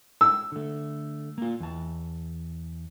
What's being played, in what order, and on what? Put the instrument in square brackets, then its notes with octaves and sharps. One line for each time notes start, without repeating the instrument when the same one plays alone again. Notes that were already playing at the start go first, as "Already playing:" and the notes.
[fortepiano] E6
[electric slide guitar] D3 A3
A#3 F4
E2 A5